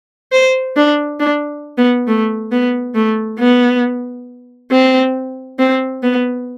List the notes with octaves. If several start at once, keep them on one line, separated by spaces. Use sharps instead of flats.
C5
D4
D4
B3
A3
B3
A3
B3
C4
C4
B3